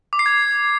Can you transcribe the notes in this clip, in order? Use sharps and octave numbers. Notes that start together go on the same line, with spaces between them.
D6
C7
G#6